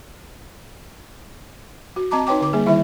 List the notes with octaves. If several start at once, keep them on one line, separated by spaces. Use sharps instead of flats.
F#4
C4 D#5 A5 A#5 D6
D#4 B4 C#5 G5 D6
D3 D6
G3 A#3 G#4
D#3 G3 E4 E5